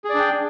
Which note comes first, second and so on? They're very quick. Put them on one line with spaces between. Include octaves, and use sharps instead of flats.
G#4 D5 D4 G5